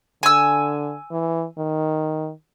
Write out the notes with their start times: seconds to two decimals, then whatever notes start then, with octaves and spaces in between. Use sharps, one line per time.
0.23 D3 G#5 E6
1.11 E3
1.58 D#3